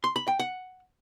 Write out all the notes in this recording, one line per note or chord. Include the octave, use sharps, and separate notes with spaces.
C6
B5
G5
F#5